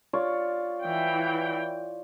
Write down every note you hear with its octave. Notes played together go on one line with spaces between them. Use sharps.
F4 C#5 D5
E3 G5